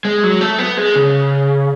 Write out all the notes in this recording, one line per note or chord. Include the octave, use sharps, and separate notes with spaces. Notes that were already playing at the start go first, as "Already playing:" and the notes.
G#3
F#3
A3
B3
G#3
C#3